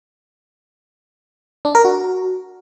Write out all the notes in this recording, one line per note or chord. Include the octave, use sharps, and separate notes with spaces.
D4
A#4
F#4